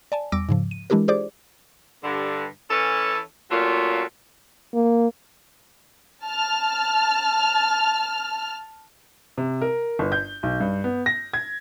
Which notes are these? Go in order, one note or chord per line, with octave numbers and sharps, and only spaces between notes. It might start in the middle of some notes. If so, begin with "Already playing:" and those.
D5 G#5 A5
E2 G3 D6 E6 A#6 D7
G#2 C#3 F3
D#7
E3 G#3 D4 E4 G4 A#4
F4 G4 G#4 C5 D5 D6
G2 D3
E3 C#4 A4
A#2 F#3 A3 C#4 F4 F#4
A#3
A5 F6
C3
A#4
G1
G6
B1
G2
B3
A#6
G#6